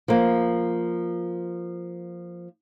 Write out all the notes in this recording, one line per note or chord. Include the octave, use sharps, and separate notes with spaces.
F3 A#3